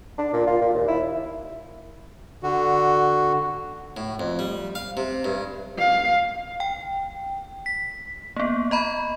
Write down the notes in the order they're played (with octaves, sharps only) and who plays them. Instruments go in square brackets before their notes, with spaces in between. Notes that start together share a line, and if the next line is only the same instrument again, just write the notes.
[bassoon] D4
A#2
F4
A#2
D#2
E4
[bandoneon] D3 F#4
[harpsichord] A2
F2
G3
F5
C3
G2
[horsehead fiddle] F5
[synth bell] G5
B6
A#3 B3
D#5 A#5 B5